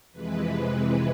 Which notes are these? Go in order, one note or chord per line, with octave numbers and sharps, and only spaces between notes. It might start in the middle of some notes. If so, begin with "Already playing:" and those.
F2 C3 E3 G#3 B4
B4